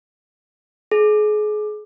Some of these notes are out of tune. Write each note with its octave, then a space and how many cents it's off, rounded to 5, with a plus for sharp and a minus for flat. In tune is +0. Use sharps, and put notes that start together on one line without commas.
G#4 +30